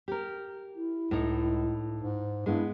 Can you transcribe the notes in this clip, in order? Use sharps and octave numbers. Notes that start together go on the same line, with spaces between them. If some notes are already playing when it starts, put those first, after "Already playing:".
G4 A#4
E4
C#2 A2 D#4
G#2
G2 G#3 B3 E4